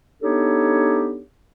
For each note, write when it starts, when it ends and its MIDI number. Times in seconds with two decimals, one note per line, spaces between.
0.22 1.20 59
0.22 1.20 62
0.22 1.20 63
0.22 1.20 67
0.22 1.20 69
0.22 1.20 73